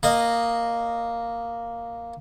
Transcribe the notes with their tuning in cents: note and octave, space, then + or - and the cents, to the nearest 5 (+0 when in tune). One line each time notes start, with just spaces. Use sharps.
A#3 +0 D#5 -10